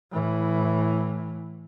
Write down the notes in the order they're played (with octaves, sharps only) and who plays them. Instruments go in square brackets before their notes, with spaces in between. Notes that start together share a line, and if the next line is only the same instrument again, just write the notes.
[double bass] A2 E3